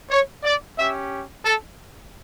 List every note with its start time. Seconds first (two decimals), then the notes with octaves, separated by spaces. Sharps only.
0.10 C#5
0.44 D5
0.77 C#4 G4 E5
1.44 A4